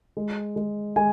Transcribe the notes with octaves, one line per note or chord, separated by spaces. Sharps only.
G#3
G#3
G#3 G#5